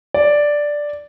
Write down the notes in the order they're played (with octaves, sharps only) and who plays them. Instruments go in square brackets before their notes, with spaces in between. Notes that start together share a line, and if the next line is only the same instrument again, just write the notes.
[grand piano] D5